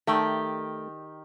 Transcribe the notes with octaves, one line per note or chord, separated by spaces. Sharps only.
D#3 A3 G4 D5